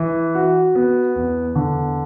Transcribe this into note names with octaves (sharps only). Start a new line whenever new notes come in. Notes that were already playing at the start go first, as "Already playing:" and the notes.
Already playing: E3
F#4
B3
E2
D3